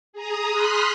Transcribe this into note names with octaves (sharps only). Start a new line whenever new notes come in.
G#4 A#5 D#6
B5 C6 D#6 F6 F#6 B6